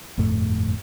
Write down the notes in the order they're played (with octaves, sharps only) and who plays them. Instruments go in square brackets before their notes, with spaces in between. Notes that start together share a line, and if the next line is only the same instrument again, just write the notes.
[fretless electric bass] G1 F2 A2 A3